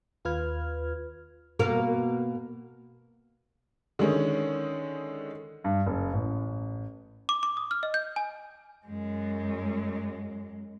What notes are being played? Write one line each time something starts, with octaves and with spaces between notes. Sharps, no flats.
D#2 F4 B4 F6 G#6
B2 A#3 A#4
D3 D#3 G#3 C#4
G2
F#1
A1
D6
D6
D#6
F6
D#5
G6
G#5
F#2 G#3